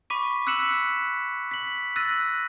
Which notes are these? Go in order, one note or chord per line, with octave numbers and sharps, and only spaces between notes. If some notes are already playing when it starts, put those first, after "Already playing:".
B5 C#6 D6 B6 D#7
E6 F#6 B6 C#7 E7 F#7
B6 F#7
E6 F#6 A6 A#6 D#7 F#7